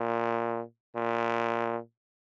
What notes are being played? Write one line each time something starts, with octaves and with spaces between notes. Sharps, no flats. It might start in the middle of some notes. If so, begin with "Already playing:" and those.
Already playing: A#2
A#2